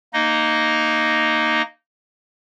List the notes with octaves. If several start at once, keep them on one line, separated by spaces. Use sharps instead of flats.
A#3 D#4 D#5